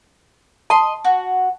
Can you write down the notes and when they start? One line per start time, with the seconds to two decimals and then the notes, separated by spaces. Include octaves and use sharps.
0.70 D#5 A5 C6
1.05 F#4